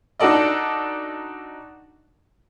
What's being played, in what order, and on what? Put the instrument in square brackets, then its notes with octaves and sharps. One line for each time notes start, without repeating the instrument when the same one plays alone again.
[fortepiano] D4 D#4 F#4 A4 D5 D#5